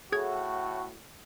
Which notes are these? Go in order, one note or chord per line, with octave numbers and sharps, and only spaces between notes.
A2 F#4 G#4 G#6